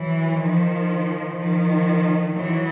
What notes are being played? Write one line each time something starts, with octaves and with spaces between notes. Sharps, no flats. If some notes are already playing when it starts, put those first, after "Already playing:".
Already playing: E3 F#3
D#3 F3
D#3 F3
E3 F#3